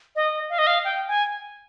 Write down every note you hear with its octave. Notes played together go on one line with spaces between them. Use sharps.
D#5
F5
D#5
F5
G5
G#5